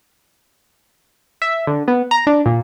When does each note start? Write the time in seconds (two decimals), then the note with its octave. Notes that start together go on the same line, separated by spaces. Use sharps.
1.42 E5
1.67 D3
1.88 B3
2.11 A#5
2.27 D4
2.46 A#2